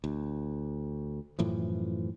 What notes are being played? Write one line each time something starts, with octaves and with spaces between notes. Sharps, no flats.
D2
F#2 A2 E3 F3